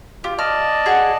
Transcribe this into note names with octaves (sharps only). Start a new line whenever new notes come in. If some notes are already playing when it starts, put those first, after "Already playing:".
F4 G4
D5 D#5 A5 F6
G#4 F#5